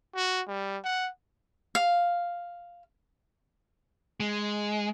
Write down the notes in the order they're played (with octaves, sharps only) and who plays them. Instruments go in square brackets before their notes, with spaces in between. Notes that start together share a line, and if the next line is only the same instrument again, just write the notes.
[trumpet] F#4
G3
F#5
[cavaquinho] F5
[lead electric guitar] G#3